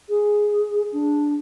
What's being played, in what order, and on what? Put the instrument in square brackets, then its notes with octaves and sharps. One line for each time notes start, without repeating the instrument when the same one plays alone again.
[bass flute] G#4
D4